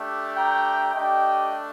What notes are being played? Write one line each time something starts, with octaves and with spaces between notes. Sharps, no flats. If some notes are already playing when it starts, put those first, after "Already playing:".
Already playing: A3 D4 G4
G5 A#5
A3 D4 G4 D#5 G5